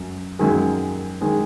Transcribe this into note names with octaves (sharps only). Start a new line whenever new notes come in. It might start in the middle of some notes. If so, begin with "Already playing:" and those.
Already playing: F#2
F#2 D#3 G#3
D#3 G#3